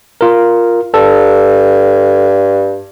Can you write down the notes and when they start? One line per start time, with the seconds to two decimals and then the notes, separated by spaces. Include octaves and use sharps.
0.21 F4 A#4
0.94 G2 A4